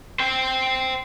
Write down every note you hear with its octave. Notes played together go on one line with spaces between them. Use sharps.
C5 G5